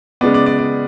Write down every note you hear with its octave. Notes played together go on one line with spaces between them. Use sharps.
C#3 G#3 B3 D5
D5
D5
D5